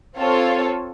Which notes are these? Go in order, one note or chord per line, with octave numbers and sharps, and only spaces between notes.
C4 F4 A4 C#5